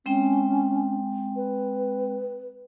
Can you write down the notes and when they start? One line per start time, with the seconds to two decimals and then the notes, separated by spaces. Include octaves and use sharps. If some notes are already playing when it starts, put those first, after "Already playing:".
0.06 G#3 C4 C#4 G5
1.36 B4